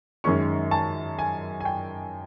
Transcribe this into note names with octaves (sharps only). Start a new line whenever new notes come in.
F#2 D#3 G#3 C#4 C#6
A5
G#5
G#5
G5